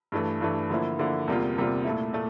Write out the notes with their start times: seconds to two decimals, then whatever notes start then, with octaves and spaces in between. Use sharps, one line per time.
0.12 G2 E3 A3
0.41 G2 E3 A3
0.70 D3 F3 A#3 E4
0.99 D3 F3 A#3 E4
1.28 E2 C3 G3 A#3 F4
1.57 E2 C3 G3 A#3 F4
1.85 A#2 A3 E4
2.13 A#2 A3